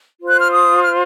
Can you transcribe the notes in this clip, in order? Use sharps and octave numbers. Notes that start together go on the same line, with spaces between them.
F4 C5
F#6
F6
D#6
F6